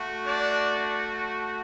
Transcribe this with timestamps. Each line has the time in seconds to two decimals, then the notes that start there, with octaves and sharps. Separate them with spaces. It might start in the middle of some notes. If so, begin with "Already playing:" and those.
Already playing: A3 F#4
0.24 D4 D5